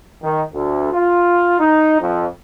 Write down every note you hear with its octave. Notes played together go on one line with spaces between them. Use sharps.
D#3
D2
F4
D#4
F2